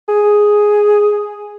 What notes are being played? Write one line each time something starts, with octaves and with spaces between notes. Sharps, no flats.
G#4